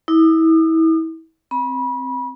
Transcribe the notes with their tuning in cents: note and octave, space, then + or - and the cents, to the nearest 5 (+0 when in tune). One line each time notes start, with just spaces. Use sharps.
E4 -30 D#6 -45
C4 +0 B5 -30